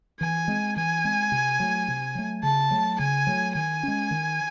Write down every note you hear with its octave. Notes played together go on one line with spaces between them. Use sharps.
E3 G#5
G#3 C4
E3 G#5
G#3 C4
C3
F#3 A3
C3
F#3 A3
C#3 A5
F#3 A3
C#3 G#5
F#3 A3
D#3 G#5
G#3 C#4
D#3